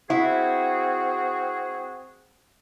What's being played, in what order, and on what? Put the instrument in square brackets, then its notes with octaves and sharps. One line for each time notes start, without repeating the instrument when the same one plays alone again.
[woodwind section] C4 F#4 G#4 [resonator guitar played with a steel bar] E4